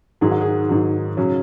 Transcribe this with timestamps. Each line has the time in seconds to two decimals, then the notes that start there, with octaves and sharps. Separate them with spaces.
0.21 G#2 D#3 F#3 G#4
0.31 F#4
0.41 G#4
0.69 G#2 D#3 F#3
1.17 C#3 F#3 C#4